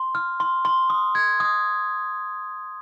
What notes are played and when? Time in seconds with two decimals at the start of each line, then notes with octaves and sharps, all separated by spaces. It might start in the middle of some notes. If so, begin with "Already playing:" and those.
Already playing: C6
0.15 F6
0.40 C6
0.65 C6
0.90 D#6
1.15 G#6
1.40 D#6